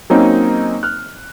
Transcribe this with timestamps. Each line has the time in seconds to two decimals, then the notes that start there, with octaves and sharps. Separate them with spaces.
0.10 F#3 A#3 C4 C#4 D#4
0.83 F6 F#6